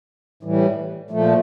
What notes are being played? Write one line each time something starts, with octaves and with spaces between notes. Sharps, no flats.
A2 E3 G3
A#2 F3 A3